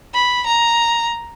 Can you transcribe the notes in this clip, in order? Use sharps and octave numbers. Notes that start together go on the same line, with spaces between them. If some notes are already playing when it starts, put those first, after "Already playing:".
B5
A#5